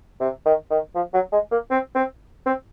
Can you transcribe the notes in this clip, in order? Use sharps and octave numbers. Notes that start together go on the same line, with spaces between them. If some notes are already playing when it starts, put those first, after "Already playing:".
C3
D#3
D#3
F3
F#3
G#3
A#3
C4
C4
C4